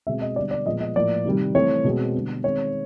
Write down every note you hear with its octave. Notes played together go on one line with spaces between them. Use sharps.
B2 G#3 C4 E5
D#5
D3 G3 B3 D5
D5
A#2 F3 G#3 B3 D#5
D#5
A2 F3 A#3 D5
C3 D#3 G3
E3 A3 C4 C#5
B2 G#3 C4
D3 G3 B3
D#3 G#3 C4 C#5